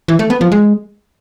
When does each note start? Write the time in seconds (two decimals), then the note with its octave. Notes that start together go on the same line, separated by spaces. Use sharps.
0.08 E3
0.19 A3
0.30 B3
0.41 F3
0.52 G#3